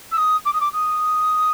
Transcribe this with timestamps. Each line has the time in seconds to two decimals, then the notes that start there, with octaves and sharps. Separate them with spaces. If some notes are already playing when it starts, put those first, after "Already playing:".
0.12 E6
0.17 D#6
0.45 D6
0.53 D#6
0.61 D6
0.73 D#6